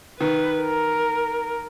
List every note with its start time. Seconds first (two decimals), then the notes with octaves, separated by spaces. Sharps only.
0.20 D#3 B4
0.61 A#4